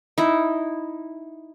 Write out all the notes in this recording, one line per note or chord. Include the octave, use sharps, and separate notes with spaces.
D#4 E4